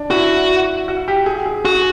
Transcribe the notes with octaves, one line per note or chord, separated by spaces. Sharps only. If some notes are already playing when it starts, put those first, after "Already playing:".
Already playing: D4
E4 F#4
F#4
G4
G#4
G#4
F#4 G#4